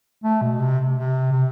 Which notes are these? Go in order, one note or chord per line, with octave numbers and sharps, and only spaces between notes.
A3
B2
C3
C3
C3